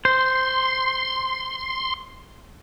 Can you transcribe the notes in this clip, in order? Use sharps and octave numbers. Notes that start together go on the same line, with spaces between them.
C5 C6